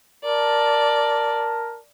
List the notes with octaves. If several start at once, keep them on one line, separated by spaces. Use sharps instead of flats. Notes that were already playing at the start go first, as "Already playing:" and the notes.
A#4 D5 A5